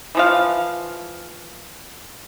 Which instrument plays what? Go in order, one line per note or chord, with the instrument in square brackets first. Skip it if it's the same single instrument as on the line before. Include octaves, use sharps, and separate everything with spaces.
[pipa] E3 F3 F5